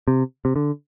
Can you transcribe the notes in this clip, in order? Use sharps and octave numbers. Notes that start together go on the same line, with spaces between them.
C3
C3
D3